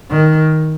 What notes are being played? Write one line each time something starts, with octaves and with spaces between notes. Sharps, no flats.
D#3